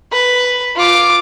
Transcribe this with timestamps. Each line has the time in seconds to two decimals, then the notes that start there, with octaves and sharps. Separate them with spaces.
0.12 B4
0.76 F4 D6